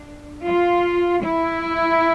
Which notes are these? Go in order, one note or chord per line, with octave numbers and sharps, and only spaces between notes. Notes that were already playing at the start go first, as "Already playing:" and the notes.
Already playing: D4
F4
E4